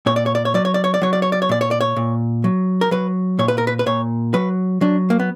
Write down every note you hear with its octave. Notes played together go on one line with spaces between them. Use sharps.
A#2 C#5
D5
C#5
D5
C#5
F#3 D5
C#5
D5
C#5
D5
F#3 C#5
D5
C#5
D5
C#5
A#2 D5
C#5
D5
C#5
A#2
F#3
A#4
F#3 B4
A#2 C#5
B4
A#4
B4
B4
A#2 C#5
F#3 B4
F#3 D4
A#3
B3